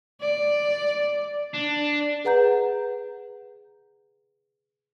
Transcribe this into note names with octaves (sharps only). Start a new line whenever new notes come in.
D5
D4
G#4 B4 F#5 A#5 G6